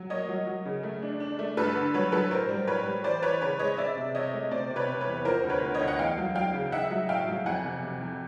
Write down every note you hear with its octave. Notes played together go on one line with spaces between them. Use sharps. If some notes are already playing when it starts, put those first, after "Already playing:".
Already playing: F#3
A#3 C#5 D#5
F#3
F#3
C#3
A3
D4
D4
A3
G2 A4 B4
D3
F#3 B4 C#5
F#3 A4 B4
A2 A#4 C5
G3
A2 B4 C#5
G3
E3 C5 D5
E3 B4 C#5
C#3 B4 C#5
G#3 C#5 D#5
C4 D5 E5
C3
C3 C#5 D#5
A3
C3 C5 D5
C3
B4 C#5
C3
B4 C#5
E2
F3 A#4 C5
D2
B4 C#5
D2
C#5 D#5
D2
F#5
E2 F5 G5
F#3
F#3 F5 G5
C#3
D#4 E5 F#5
F#3
A2 F5 G5
F#3
F2 F#5 G#5
C3
C3
F2